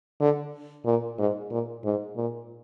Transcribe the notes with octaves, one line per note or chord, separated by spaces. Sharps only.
D3
A#2
G#2
A#2
G#2
A#2